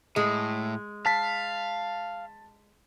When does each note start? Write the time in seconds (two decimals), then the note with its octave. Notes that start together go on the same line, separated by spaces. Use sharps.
0.16 A2 G#3
1.06 F5 A5 B6